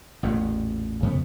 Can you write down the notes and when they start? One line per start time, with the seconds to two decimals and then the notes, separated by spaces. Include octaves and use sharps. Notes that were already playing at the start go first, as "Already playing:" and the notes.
0.23 A1 E2 A#2
1.03 F2 C#3 A#3 B3